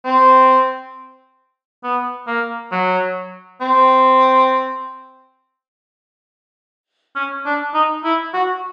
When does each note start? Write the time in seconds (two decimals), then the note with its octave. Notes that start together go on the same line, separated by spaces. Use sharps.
0.05 C4
1.83 B3
2.27 A#3
2.72 F#3
3.61 C4
7.16 C#4
7.46 D4
7.74 D#4
8.05 E4
8.34 F#4